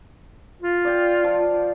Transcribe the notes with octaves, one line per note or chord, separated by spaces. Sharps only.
F4
D5 G5
F3